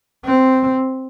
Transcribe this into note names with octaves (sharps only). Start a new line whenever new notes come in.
C4